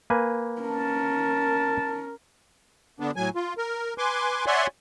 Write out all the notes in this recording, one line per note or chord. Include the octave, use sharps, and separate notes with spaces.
A#3 B4 G#5
C#4 A#4 A5
D3 B3 D4
A2 F#3 G#5
F4
A#4
B4 G#5 C6 D6
C#5 D5 E5 F#5 G#5 C6